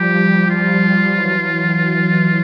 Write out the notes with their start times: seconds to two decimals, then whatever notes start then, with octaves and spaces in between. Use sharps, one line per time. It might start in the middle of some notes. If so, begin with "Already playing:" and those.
Already playing: F3 G3 G4
0.50 F4
1.11 E3 F#3